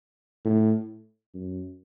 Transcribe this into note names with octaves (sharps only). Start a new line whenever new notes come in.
A2
F#2